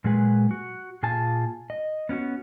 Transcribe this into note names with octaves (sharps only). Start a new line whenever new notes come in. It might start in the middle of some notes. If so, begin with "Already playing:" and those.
A#2 F#3 G#3 G#4 B4 G#5
F#4
A#2 F4 G#4 G#5 A5
D#5
B3 C#4 E4 F#4